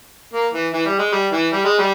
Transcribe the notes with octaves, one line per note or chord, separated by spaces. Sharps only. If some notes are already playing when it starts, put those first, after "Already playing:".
A#3
E3
E3
G3
G#3
G3
E3
G3
G#3
G3